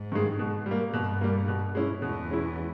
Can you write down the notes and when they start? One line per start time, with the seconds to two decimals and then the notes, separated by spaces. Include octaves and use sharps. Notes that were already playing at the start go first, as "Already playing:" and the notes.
Already playing: G#2
0.12 G2 D#3 G#3
0.39 B2
0.66 G3
0.71 A#3
0.93 G2 B2
1.21 G3 A#3
1.48 B2
1.75 G#3 C#4 E4
2.02 E2 B2
2.30 G#3 C#4 E4